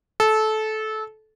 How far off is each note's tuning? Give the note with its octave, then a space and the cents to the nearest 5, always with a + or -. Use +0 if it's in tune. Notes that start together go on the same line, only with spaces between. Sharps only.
A4 -20